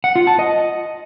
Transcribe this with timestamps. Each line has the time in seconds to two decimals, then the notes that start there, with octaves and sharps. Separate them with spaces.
0.04 F#5
0.16 F4
0.27 A5
0.39 D#5